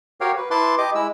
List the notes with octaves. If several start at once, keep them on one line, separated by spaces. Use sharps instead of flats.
F#4 G4 A#4 C#5 F5 G5
B4
E4 B4 A5 C6 D6
G4 D#5 D6
G#3 E4 E6